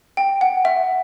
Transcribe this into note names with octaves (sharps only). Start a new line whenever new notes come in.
G5
F#5
E5